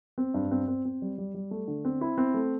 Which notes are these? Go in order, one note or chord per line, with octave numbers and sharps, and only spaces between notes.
C4
G2
C4
C4
C4
G3
G3
G3
A3
D3
C4
E4
C4
A3